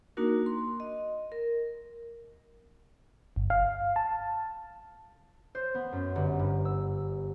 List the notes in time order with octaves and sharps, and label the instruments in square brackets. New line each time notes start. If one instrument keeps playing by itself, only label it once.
[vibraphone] A#3 D4 D#4 F#4 A#4
C6
D#5
A#4
[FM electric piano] G1
F5
A5
[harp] C5
B3
F#2
G1
G2
E6